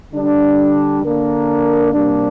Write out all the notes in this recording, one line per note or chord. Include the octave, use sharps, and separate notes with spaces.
D3 G3 D4
D3 A#3 D4 A#4
C3 G3 A#3 D4